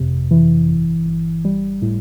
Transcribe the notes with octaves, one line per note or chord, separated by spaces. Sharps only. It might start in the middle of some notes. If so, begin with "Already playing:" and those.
Already playing: G1 F2 C3
E3
G1
G1
G3
A2